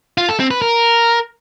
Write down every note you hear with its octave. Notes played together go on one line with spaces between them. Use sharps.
F4
A4
C4
B4
A#4